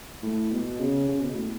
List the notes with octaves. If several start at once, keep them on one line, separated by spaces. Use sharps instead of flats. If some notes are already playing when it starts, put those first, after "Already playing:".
A2
B2
C#3
C#3
B2
A2